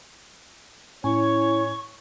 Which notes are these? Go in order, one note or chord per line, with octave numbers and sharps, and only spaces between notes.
A2 C#4 E4 C#5 G#5 C#6